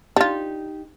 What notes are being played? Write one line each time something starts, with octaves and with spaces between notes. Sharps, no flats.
D4 D#4 F4 G4